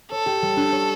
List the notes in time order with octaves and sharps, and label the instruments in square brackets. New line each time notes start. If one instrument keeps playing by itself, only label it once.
[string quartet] A4 [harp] C#5
[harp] G4
G3
D4
C#5